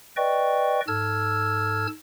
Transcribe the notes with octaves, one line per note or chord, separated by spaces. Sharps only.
B4 D5 D#5 G5 C#6
G#2 A4 A5 E6 F6 G#6